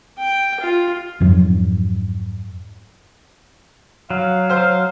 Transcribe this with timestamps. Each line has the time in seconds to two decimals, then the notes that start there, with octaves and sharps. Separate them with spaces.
0.18 G5
0.60 F4
1.20 F2 G#2 F#3
4.10 F#3 F5
4.50 C5 F6